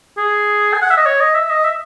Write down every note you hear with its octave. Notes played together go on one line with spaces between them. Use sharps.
G#4
G#5
F#5
E5
D#5
C#5
D#5
E5
D#5
E5